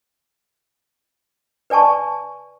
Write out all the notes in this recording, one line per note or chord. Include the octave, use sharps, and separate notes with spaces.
B4 D5 G#5 A5 C#6